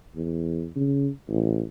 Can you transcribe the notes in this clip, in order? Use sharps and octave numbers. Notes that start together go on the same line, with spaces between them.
E2
C#3
A1